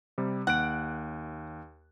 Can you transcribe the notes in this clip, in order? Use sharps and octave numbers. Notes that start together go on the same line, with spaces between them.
C3 G3
D#2 F#5 F#6 D7